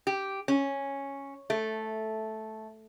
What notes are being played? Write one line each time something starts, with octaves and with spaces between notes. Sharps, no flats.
G4
C#4
A3